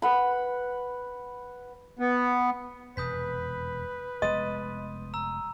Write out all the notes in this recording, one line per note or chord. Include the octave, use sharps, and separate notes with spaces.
B4 F#5 B5
B3
E1 F2 C3 B4 D#6 G6 B6
F1 G#3 B3 D#5 C6 D#6 D#7
A#5 E6